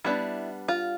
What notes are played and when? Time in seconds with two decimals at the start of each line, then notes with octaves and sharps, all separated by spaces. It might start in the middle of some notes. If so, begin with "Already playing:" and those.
0.04 G3 B3 D4 E4
0.68 F4